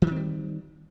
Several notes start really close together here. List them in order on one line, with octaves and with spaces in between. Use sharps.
E3 D#3 C4 G3